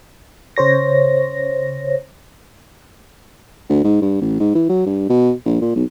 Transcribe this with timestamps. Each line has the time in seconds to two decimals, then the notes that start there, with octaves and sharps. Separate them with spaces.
0.57 C#3 C5 C#5 A#6
3.69 D2
3.84 G#2
4.02 G2
4.21 A1
4.40 G#2
4.55 E3
4.69 F#3
4.86 G2
5.09 B2
5.45 A#1
5.61 A#2
5.75 B1